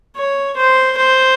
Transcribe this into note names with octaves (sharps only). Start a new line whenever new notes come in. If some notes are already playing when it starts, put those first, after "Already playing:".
C#5
C5
C5